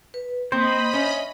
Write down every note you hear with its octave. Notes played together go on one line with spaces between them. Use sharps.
B4
A#3 C4 C5 D#5 B5
C#4 E5